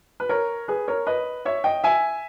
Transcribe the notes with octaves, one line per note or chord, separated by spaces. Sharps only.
B4
A#4 C#5
G#4 B4
A#4 C#5
B4 D#5
C#5 E5
D#5 G5
E5 G#5